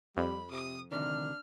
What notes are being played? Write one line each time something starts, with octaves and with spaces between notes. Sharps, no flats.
F2 G3 B5
C3 D#6
D2 C3 D#3 D4 F6